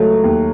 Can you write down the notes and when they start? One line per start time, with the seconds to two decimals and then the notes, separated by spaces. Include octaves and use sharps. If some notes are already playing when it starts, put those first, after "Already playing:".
Already playing: C#2 F#3 A3
0.24 D#2